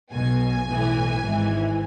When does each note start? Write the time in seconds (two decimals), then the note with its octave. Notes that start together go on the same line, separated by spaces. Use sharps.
0.11 B1 B2 G#5
0.67 B1 A2 E3
1.23 G#1 G#2 E3